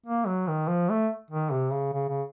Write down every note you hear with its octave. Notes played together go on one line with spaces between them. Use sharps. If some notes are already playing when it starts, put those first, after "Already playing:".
A#3
F#3
D#3
F3
A3
D#3
C3
C#3
C#3
C#3